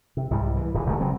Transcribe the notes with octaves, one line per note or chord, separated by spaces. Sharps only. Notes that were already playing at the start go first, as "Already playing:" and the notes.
C3
C2 G#2 C3 G3
E3
D1 A#2 D#3 E3
D#1 D3 G#3 A3
C#3 F#3 G3 C4